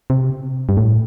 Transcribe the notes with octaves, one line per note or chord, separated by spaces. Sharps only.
C3
G2
A2